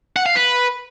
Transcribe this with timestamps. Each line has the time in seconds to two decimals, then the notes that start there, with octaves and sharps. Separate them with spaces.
0.16 F#5
0.26 F5
0.35 B4